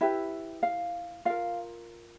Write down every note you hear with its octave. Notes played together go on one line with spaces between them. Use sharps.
E4 G4 B4 E5
F5
F4 A#4 F5